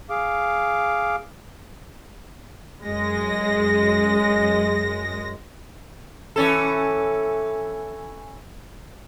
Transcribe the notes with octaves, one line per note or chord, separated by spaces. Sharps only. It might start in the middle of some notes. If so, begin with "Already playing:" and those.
G#4 F5 D6
F#2 G#3 A#6
E3 C#4 A4